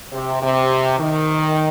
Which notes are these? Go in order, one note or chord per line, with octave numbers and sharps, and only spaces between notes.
C3
C3
D#3